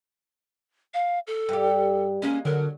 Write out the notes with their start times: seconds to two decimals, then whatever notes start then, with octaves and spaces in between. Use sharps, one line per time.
0.94 F5
1.27 A4
1.49 G2 G4
2.22 G#3 A#3 C#4
2.45 D3 F#3 A#4